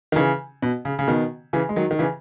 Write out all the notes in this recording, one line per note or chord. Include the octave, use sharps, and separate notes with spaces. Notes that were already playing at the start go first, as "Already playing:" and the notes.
D#3
C#3 E3
B2
C#3
C#3
B2 D#3
C#3 E3
G#3
D#3 F#3
D#3
C#3 E3